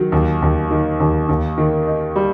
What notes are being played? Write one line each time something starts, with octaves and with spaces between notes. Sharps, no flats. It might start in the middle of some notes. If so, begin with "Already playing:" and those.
Already playing: D#3 F#3
D#2
D#2
D#3
D#2
D#2
D#3
D#4
G3